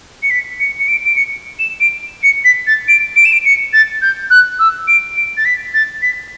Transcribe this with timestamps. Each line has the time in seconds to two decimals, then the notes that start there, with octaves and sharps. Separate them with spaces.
0.23 C#7
0.31 B6
0.60 C#7
0.79 C#7
0.88 D7
1.05 D7
1.16 C#7
1.59 E7
1.80 D7
2.23 C#7
2.45 B6
2.67 A6
2.88 D7
3.16 D7
3.25 E7
3.32 D7
3.45 C#7
3.73 A6
4.02 G6
4.30 F#6
4.59 E6
4.88 D7
5.16 D7
5.37 A6
5.45 B6
5.74 A6
6.02 B6